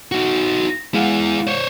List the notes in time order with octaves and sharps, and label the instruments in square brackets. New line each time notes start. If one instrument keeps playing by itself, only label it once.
[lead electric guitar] D#4 F#4
[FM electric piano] G#3 F5 F#5 [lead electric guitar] E4 G#4
[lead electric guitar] C5 C#5